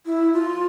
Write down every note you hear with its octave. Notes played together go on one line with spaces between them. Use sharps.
E4
F4